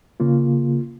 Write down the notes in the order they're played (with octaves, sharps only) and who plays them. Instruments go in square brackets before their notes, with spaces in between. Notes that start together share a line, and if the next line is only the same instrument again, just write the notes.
[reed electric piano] C#3 A#3 F4